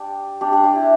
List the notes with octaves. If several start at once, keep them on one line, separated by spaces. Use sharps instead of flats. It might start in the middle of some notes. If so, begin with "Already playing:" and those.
Already playing: D4 G4
D4 G4
D4 G4
D4 G4
E4